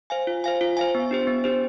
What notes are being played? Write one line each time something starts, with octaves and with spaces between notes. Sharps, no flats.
C5 F5 G#5
F4
C5 F5 G#5
F4
C5 F5 G#5
B3
D4 G4 C5
B3
D4 G4 C5